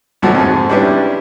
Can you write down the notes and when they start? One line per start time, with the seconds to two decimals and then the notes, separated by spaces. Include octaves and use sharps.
0.22 D2 B2 F3 F#3 A3 F#4
0.35 F2 G#2
0.69 G3 C#4 D4 E4 B4